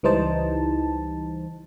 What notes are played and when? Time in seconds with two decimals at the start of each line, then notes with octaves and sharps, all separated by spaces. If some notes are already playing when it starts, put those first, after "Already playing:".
0.03 C#2 E3 G3 D#4 C5 A5